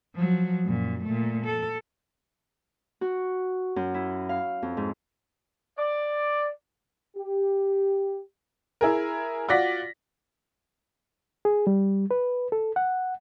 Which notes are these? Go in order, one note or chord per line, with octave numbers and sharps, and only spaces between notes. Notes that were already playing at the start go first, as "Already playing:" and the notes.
F3 F#3
F#2 A#2
A#2 A3
A4
F#4
F#2
E4
F5
F2
G#2
D5
G4
E4 G#4 A#4
F4 F#4 D5 A#6 B6
G#4
G3
B4
A4
F#5